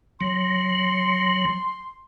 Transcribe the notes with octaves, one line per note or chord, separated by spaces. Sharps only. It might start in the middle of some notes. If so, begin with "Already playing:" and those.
F#3 C6